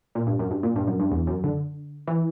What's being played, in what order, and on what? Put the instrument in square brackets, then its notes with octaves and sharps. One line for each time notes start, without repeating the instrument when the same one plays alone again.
[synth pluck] A#2
G2
F#2
G2
A#2
G2
F#2
G2
E2
F#2
D3
E3